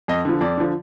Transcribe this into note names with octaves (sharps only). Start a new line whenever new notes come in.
F2 D#5
D3 F3
F2 D5
D3 F3